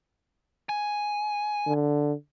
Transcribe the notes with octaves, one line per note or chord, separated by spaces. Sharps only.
G#5
D3